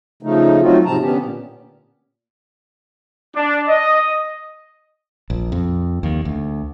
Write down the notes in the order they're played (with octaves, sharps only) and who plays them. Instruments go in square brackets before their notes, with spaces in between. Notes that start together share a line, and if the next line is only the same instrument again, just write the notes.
[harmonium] C#3 F3 A3 D#4
F#3 A3 C4 D#4 F4 F#4
G#2 C3 F3 C4 A5 A#5
D3 B3 C#4 G4
A#2
[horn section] D4
D#5
[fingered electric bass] A#1
F2
D#2
D2